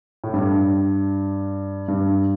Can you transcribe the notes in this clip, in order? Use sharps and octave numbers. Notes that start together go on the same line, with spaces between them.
A2
G2
G2